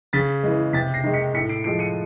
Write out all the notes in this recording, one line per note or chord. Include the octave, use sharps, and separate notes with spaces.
C#3 A6 B6
E3 G#3
C3 A6 B6
A#6 C7
D#3 G#3
B6 C#7
A2 B6 C#7
C7 D7
F3 G#3 C7 D7
C#7 D#7